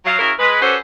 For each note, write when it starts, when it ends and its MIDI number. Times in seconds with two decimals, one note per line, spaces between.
0.05 0.15 54
0.05 0.15 77
0.18 0.31 49
0.18 0.31 64
0.18 0.31 66
0.18 0.31 68
0.18 0.31 70
0.39 0.61 56
0.39 0.61 71
0.62 0.75 61
0.62 0.75 66
0.62 0.75 67
0.62 0.75 69
0.62 0.75 71
0.62 0.75 72